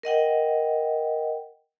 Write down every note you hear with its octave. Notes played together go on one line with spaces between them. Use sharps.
A#4 D#5 F#5 G5